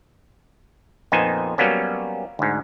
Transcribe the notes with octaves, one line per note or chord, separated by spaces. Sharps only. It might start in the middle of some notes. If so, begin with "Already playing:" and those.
F2 A#2 B3 D#4 C5 G#5
F#3 G3 A#3 B3 C#4
D2 G#2